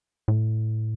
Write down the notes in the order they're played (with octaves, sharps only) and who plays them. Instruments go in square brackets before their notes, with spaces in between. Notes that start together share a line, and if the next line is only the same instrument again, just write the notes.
[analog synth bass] A2